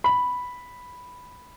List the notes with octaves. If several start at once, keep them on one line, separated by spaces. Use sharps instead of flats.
B5